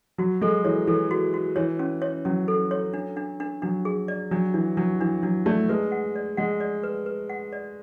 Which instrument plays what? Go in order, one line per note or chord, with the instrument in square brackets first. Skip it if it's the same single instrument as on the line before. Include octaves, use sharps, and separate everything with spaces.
[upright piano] F#3 [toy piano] F#4
[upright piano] G#3 [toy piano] A4
[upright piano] E3 [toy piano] C#5
[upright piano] E3 [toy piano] A4
[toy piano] F#4
F#4
[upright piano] E3 [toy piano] C#5
[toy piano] C#4
C#5
[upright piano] F#3 [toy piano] C#4
[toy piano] A4
C#5
D4
D4
D4
[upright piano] F#3 [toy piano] D4
[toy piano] G#4
D5
[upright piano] F#3 [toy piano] D4
[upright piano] E3 [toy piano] D4
[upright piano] F#3 [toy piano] D4
[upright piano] E3 [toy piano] D4
[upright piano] F#3 [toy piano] D4
[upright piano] A3 [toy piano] D5
[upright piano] G#3 [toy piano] B4
[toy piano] F#5
D5
[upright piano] G#3 [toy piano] F#5
[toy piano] D5
B4
B4
F#5
D5